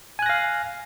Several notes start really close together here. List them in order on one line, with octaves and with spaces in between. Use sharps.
G#5 F#6 A#6 F5